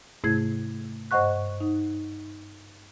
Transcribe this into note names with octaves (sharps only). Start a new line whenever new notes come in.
G#2 C3 A3 E4 G#4 G#6
G2 C5 D#5 F#5 C#6 F#6
D#4